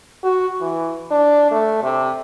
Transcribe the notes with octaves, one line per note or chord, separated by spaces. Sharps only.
F#4
E3
D4
A3
C3